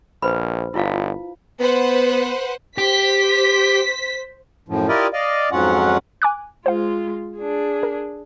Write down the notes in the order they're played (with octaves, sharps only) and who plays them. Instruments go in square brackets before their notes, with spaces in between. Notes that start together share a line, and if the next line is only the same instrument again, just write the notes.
[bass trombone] A#1 [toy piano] B4 C5 B5
[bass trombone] G1 [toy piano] E4 F4 F5
[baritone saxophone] B3 [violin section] B4 C5 F#5
[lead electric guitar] G4 [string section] C5 B6
[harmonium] F#2 A2 F3
E4 F4 G4 A#4 D5 D#5
D5 D#5 F5
F2 G#2 F#3 C#4 F4 F#5
[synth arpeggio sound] G#5 D6 F#6
[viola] G#3 F4 [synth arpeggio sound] C5 F5
[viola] D4 G#4
[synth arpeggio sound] A#4